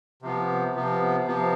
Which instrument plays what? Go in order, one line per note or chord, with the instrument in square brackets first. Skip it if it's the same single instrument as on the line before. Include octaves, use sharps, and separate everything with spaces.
[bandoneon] C3 F3 B3
C3 F3 B3
C3 F3 B3